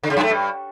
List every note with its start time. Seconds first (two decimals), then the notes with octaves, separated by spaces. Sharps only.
0.03 D3
0.10 C#3
0.17 F#2
0.23 A3
0.30 G2